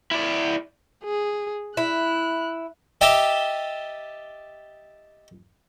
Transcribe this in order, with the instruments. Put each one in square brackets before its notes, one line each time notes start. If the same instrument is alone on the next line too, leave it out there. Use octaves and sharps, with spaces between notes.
[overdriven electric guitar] E4 D5
[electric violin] G#4
[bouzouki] E4 [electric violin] F#6
[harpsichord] G4 D#5 E5 G5 A5